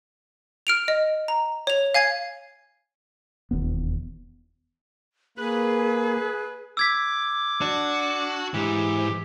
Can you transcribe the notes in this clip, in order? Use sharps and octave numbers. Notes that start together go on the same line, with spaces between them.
F6 D7 F7
D#5
A#5
C#5 F7
F5 G#5 G#6 C7
E1 D#2 B3
A#3 G#4 B4
D6 E6 G#6 B6
D4 F#4
G#2 E3 G4